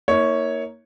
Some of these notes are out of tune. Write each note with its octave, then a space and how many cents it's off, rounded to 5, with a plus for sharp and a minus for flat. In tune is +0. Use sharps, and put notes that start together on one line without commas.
A#3 +0 E4 -45 C#5 +0